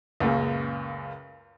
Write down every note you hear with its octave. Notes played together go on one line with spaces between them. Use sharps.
C#2 F#2 A#2 C#3